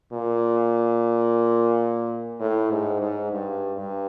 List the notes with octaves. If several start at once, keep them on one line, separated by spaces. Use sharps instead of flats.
A#2
A2
G#2
G#2
G2
G2